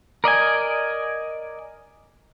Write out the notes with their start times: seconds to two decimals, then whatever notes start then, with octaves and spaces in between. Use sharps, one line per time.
0.24 A#4 D5 D#5 G#5